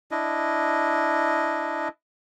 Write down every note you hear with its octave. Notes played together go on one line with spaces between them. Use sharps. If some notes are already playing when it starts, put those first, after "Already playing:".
D4 E4 D#5